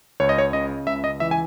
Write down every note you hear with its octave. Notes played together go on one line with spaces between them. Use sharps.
C#2 C#5
D#5
C#5
C#3 D#5
C#2 E5
D#5
E3 E5
G#5